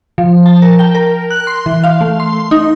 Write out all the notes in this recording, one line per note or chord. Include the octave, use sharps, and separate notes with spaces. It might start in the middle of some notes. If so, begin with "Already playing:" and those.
F3
A5
A#4
G5
A#4
F#6
C6
E3
F5
A3
C6
D#4